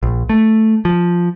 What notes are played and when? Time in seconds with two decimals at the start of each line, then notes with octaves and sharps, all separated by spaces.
0.03 A#1
0.29 A3
0.85 F3